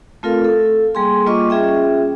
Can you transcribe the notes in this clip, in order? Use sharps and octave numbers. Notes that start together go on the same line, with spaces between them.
A3 C4 F4 A4 A#4 F5
A4
G3 A#3 G#4 G5 G#5 C6
G3 A#3 F4 D#5 C#6 D6
C#4 F4 G#4 E5 G5